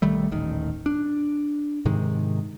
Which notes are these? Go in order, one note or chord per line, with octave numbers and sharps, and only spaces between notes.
B1 D#3 G3 A3
D#1 A1 D#3
D4
G#2 C3 D#3 G#3